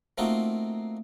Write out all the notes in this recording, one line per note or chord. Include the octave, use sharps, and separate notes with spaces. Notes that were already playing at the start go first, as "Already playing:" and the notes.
A3 A#3 C4 D#4 F4 F#4